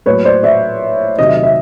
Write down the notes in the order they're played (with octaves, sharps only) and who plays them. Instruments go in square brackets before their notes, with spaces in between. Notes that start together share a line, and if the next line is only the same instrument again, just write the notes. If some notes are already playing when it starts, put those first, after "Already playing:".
[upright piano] A2 F#3 A#3 B4 C#5
C5 D5
D5 E5
C3 D#3 F#3 D#5
E5
D#5
E5